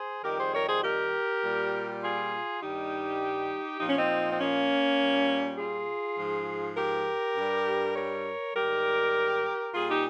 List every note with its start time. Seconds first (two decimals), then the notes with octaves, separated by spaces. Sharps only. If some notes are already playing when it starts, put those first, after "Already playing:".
Already playing: G#4 C5
0.24 F2 D#3 G3 G4 A#4
0.39 G#4 C5
0.54 A#4 C#5
0.69 G#4 C5
0.84 G4 A#4
1.43 A#2 G3
2.03 F4 G#4
2.62 G2 D#3 G3 D#4 G4
3.80 A#2 F3 D#4
3.88 C#4
3.97 C4 D#4
4.31 C4
4.40 A#3 C#4
5.00 A#2 G3
5.58 F4 G#4
6.18 G#2 F3
6.77 G4 A#4
7.36 G2 G3
7.96 A#4 C#5
8.55 G#2 D#3 G3 G4 A#4
9.74 A#2 G3 F4 G#4
9.89 D#4 G4